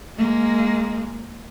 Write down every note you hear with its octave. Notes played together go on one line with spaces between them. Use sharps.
G#3 A#3